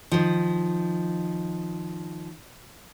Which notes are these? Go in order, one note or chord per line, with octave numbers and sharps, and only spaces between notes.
D#3 F3